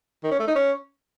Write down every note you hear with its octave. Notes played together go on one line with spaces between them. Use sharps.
D#3
C#4
A3
D#4
C#4